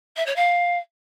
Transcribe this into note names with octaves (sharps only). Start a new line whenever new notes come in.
E5
C#5
F5